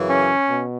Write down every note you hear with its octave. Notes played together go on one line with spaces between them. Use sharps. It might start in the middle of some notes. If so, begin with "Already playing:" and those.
Already playing: F#2 C#3 E3
C#4
B2